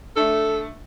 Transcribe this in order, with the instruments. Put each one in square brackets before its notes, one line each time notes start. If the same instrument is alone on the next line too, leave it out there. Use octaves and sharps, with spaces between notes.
[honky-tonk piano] A3 D4 [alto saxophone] A4